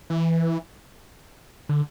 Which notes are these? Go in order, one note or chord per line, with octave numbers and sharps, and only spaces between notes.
E3
D3